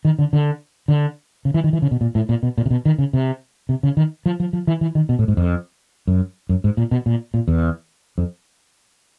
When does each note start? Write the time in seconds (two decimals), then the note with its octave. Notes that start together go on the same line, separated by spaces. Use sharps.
0.05 D#3
0.19 D3
0.33 D3
0.88 D3
1.45 C#3
1.54 E3
1.64 D#3
1.73 E3
1.82 C#3
1.91 B2
2.01 A#2
2.15 A2
2.29 A#2
2.43 B2
2.58 A#2
2.66 C3
2.71 B2
2.85 D#3
2.98 C#3
3.13 C3
3.69 C3
3.83 C#3
3.97 D#3
4.26 F3
4.40 F3
4.53 F3
4.67 E3
4.81 E3
4.95 D#3
5.09 B2
5.19 A2
5.28 G#2
5.37 F2
6.07 F#2
6.49 F#2
6.64 G#2
6.77 A#2
6.91 B2
7.06 A#2
7.34 A#2
7.48 E2
8.18 F2